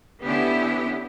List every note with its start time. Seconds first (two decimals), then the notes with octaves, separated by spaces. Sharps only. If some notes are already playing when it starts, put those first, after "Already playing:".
0.21 D3 B3 C#4 E4 G4